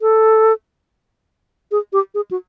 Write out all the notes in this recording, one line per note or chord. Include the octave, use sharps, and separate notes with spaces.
A4
G#4
G4
G#4
F#4